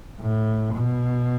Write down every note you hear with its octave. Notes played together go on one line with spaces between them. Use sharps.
A2
B2